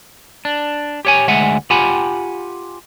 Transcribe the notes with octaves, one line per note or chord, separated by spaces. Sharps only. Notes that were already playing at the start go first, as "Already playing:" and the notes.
D4
G4 C#5 G#5
D2 G#3 E5 F#5 G#5
F4 G4 F#5 G#5 B5